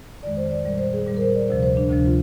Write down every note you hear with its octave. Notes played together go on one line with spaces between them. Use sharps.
F2 D#3 G#3 D5
C5
D5
A#2 G3 D5
C5
G#4
A#2 G3
A#4
C5
D5
D2 C3 F3 C5
C5
D4
D2 C3 F3 D4
F4